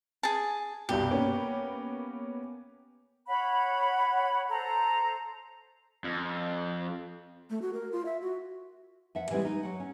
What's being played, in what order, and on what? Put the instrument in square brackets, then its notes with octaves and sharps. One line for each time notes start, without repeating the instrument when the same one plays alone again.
[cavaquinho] G#4 A5
[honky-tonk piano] C2 G2 B2 [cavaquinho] G4
[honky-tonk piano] A#3 B3 C#4
[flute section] C#5 F#5 B5
A4 C5 A#5
[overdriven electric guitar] F2
[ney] A3
F#4
A#4
F4
E5
F#4
[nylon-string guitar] F2 E5 F#5
E3 G3 G#3 C4 E4
D#4
F#3 F#5
C#4